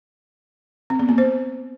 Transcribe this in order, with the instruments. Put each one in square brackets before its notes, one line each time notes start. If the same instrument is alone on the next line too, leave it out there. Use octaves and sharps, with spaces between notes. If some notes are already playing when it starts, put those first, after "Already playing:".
[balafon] C4
B3
A#3
C5